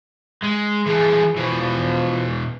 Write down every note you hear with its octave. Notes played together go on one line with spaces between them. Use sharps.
G#3
E3 F3 G#4
B2 E3 F3